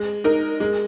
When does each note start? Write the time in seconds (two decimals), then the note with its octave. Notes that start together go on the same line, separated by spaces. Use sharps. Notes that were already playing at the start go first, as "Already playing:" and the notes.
Already playing: G#3
0.24 D#4 A#4
0.60 G#3